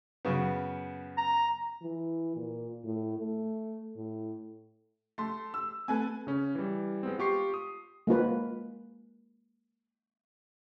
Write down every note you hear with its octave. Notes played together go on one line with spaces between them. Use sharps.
F#2 C#3 B3
A#5
E3
A#2
A2
A3
A2
A3 C6
E6
A3 C4 A4 B4 G#5
C#3 C#4
E3 G3
G#3 B3 C4
F4 G4 C#6 C7
D#6
G#3 A#3 F4 B4